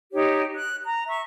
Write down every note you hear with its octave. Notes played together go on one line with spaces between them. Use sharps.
D#4 G4 C#5
F#6
A#5
E5 C#6